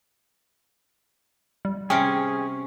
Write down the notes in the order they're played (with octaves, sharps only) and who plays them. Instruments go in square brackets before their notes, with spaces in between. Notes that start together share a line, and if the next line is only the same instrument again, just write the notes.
[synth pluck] G3
[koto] C3 C#4 [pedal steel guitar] G#4 [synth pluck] G5 F6